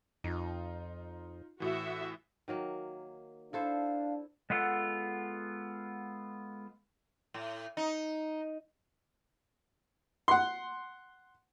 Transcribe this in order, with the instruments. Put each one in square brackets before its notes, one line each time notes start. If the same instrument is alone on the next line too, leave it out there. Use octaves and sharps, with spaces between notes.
[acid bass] F2 [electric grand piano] D#4 F4
[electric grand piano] A2 E3 [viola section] F#4 E5
[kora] D#3 F#3 A#3
[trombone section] D4 [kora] E4 A4 C5 [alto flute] F5
[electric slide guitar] G#3 B3 F4 A4 F#5
[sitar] A2
D#4
[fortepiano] F#5 C6